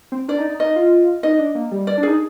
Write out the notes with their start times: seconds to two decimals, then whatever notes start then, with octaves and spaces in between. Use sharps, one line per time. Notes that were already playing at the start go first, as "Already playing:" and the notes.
0.12 C4
0.28 D4 D5
0.38 D#4
0.50 D#4
0.60 D#4 D#5
0.76 F4
1.23 D#4 D#5
1.39 D4
1.55 A#3
1.71 G3
1.87 D5
1.98 D4
2.03 D#4 G#4